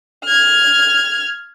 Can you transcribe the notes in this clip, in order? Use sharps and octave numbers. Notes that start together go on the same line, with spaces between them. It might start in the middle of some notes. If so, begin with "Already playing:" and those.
F6 G#6